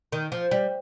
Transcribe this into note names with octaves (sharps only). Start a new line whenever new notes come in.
D#3
F3
G3